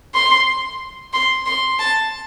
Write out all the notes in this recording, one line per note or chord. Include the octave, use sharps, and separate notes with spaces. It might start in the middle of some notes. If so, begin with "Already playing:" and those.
C6
C6
C6
A5